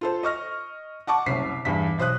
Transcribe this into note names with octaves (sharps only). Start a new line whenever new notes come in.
F4 A4 C5
D#5 C#6 F6 A#6
F#5 A5 C#6 D6
F#1 C2 C#4 B6 C7
E2 G2 B6
B1 C5 D#6 F#6